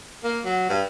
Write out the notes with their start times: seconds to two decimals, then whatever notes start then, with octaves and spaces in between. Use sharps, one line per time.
0.24 A#3
0.45 F#3
0.69 G2